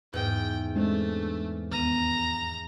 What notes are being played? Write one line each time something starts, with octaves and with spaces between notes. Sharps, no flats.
E2 G#2 G5
G#3 A3 C4 D4
D#2 B3 A#5 D#7